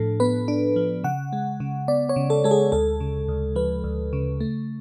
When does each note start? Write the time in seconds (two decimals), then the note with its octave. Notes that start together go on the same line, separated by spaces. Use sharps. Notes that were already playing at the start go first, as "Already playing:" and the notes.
Already playing: A2 F3 D4 A4
0.20 B3 B4
0.48 D4
0.76 F3
1.04 C#3 F#5
1.33 G#3
1.60 C#3
1.88 B3 D5
2.09 C#5
2.16 C#3
2.30 A4
2.44 G#3 A4
2.51 G#4
2.72 D2 A4
3.00 C#3
3.28 D2
3.56 F3 B4
3.84 D2
4.13 C#3
4.41 A3